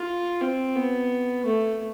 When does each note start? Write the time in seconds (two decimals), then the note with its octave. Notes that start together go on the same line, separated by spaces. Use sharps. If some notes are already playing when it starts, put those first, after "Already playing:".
Already playing: F4
0.41 C4
0.75 B3
1.46 A3